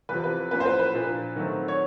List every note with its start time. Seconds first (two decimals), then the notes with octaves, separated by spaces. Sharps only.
0.09 E2 C3 F3 B4
0.24 B4
0.51 A2 F3 A#3 C#4 B4
0.60 C5
0.66 B4
0.79 B4
0.94 A#2 F3 A#3 D4
1.36 D#3 F#3 A3 C4
1.68 C#5